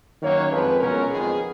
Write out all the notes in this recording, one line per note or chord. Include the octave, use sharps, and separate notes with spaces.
F#2 D#3 F#3 A#3 C#5
F2 F3 G#3 B4
C#2 B2 F#3 C#4 A#4
F2 D#3 G#3 B3 G#4